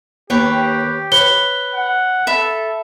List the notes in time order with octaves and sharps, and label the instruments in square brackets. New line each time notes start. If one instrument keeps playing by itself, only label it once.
[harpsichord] D#2 [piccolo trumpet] G4 [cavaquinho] B4 C#5 G5
[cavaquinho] B4 [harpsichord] C#5 [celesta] G7
[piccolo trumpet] F#5
[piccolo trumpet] A4 [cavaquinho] E5 B5